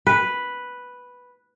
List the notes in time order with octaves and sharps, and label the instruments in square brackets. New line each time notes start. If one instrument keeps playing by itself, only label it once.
[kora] B4